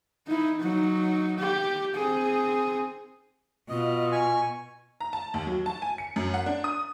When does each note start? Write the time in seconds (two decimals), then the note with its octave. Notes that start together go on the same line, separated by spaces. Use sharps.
0.27 D#4 E4
0.60 F#3 D#4
1.38 G4
1.95 C4 G#4
3.69 B2 F4 D#5
4.12 G#5 C#6
5.00 A#5
5.13 A5
5.34 D#2
5.47 F#3
5.66 A5
5.82 G#5
5.98 C#7
6.16 F#2
6.34 F#5
6.46 D4
6.64 D#6